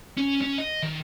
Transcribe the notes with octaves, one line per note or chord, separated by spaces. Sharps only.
C#4
C#4
D#5
D#3